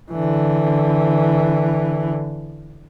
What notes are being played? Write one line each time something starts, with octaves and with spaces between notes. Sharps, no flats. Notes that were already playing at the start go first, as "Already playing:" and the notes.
D3 E3